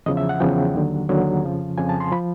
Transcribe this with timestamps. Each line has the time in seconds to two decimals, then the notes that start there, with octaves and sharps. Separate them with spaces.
0.06 E2 C#3 F3 D#5
0.17 E5
0.29 F#5
0.40 E2 C#3 F3 G5
0.74 D#2 D3 F#3
1.09 D#2 D3 F#3
1.44 F2 C#3 F3
1.78 F2 C#3 F3 G#5
1.89 A5
2.00 C6
2.12 F3 B5